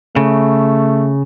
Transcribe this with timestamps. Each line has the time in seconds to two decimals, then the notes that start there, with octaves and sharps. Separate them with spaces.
0.16 C#3 A3